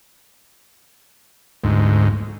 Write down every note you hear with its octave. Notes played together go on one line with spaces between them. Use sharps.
D2 G#2